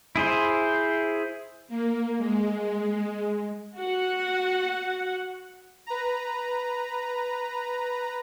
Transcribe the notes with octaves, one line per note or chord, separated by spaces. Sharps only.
E4 G#4 C5
A#3
G#3
F#4 F#5
B4 A#5